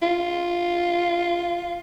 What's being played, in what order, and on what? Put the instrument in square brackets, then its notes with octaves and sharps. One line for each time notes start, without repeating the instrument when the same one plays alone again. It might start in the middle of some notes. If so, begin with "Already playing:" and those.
[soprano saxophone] F4